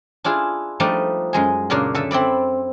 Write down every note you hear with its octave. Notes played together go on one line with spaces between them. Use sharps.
D4 E4 F4 G#4
F3 G3 A3 D4 D#4 D5
F#2 G#3 G#4
A#2 C#3 A#3 D4
D3 A4 E5
C4 E4 D5 B5